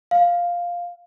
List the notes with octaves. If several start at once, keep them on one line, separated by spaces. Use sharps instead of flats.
F5